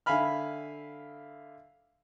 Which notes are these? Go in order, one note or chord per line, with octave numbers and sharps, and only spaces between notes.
D3 E5 F5 G#5 B5 F6